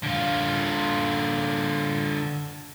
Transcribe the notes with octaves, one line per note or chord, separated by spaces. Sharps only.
D3 F4